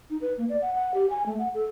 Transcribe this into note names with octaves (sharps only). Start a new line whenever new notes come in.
D#4
B4
A#3
D5
F#5
F#5
G4
G#5
A3
F#5
A4